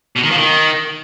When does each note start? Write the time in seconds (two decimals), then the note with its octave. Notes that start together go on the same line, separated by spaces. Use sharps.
0.16 B2
0.23 D#3
0.30 F3
0.38 D#3